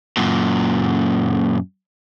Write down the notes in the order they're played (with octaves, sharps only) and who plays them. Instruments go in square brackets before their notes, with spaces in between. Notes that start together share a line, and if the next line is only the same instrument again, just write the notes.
[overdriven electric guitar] F#2 A#2